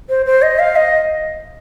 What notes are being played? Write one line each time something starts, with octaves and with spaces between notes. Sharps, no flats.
C5
C5
D#5
F5
D#5